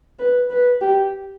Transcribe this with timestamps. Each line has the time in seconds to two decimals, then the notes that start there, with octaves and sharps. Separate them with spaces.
0.19 B4
0.50 B4
0.81 G4